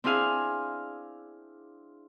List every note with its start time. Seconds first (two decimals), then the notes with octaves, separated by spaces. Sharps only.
0.04 C4 D4 E4 G#4 F5 G#5